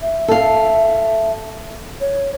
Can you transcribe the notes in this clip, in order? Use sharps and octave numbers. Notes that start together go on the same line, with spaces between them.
E5
A4 F5
C#5